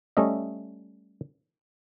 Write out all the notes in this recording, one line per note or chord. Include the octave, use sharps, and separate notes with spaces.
G3 A3 C#4 D#5 E5